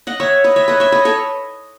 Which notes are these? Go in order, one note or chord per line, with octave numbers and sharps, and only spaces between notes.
D#5 F#5
C#5 E5
B4 D#5
C#5 E5
B4 D#5
C#5 E5
B4 D#5
A4 C#5